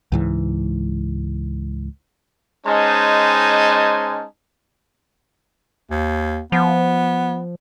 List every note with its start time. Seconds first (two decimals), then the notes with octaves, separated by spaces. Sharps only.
0.12 C#2 G#2 E3
2.66 G#3 C#4 D#4 C5 G#5 A5
5.91 D#2
6.52 F3 B3